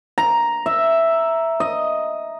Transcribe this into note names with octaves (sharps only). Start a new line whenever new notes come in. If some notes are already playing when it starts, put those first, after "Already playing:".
A#5
E5
D#5